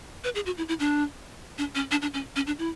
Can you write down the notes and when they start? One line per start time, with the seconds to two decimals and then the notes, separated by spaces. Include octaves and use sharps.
0.24 B4
0.35 G#4
0.46 F#4
0.58 E4
0.68 E4
0.80 D4
1.58 D4
1.75 C#4
1.91 D4
2.02 D4
2.14 C#4
2.36 C#4
2.47 D4
2.59 E4